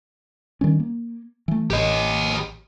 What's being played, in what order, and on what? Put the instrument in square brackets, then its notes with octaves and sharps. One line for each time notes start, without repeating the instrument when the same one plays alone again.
[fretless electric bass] D#3 G3 C#4
A#3
E3 A3
[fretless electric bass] A1 [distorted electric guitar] G4 D#5